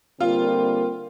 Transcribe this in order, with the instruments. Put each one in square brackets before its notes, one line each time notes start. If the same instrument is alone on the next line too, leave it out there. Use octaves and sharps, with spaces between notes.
[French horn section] D3 G3 A#3 [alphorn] C4 [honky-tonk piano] F4 [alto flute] A#4